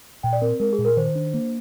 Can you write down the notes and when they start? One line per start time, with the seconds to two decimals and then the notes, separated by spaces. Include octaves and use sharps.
0.23 A#2 G5
0.33 D5
0.42 C4 A#4
0.60 G#3 A#4
0.73 G#4
0.79 A#2
0.85 A#4
0.97 D#3 C5
1.15 D4
1.34 A#3